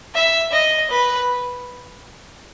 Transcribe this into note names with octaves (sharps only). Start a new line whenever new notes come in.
E5
D#5
B4